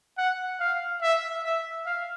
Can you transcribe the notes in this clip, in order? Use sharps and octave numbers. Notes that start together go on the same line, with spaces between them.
F#5
F5
E5
E5
F5